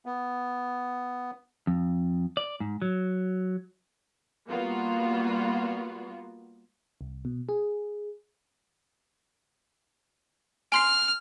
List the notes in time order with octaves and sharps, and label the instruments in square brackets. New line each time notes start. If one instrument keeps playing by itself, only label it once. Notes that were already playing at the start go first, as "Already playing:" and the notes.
[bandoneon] B3
[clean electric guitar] F2
D5
G#2
F#3
[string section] G3 A#3 B3 F4 F#4
[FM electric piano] C2
B2
G#4
[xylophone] G#5 C6 C7 [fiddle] F6